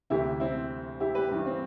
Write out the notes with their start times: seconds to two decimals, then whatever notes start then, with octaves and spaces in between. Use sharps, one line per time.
0.10 D2 C3 E3 E4 G4
0.40 C4 E4
1.00 E4 G4
1.15 G4 B4
1.31 G2 E3
1.46 C4